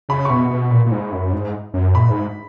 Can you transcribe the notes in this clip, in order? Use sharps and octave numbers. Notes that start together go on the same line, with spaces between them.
C#3 B5
C#6
B2 B5
B2
A#2
A#2
G#2
F#2
G#2
F#2
A#2 B5
G#2